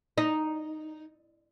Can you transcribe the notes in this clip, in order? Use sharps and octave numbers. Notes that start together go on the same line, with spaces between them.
D#4